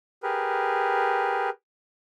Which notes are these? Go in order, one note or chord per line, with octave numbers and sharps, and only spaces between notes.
G4 G#4 A#4 B4